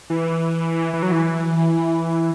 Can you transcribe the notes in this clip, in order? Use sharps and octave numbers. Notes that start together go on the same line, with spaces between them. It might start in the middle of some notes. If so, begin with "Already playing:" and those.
E3
E3
F#3
E3